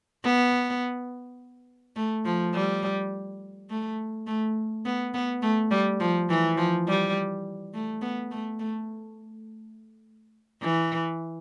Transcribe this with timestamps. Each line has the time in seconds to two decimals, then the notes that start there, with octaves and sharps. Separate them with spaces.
0.24 B3
1.96 A3
2.25 F3
2.54 G3
3.70 A3
4.27 A3
4.85 B3
5.14 B3
5.42 A3
5.71 G3
6.00 F3
6.29 E3
6.57 F3
6.87 G3
7.74 A3
8.02 B3
8.31 A3
8.60 A3
10.62 E3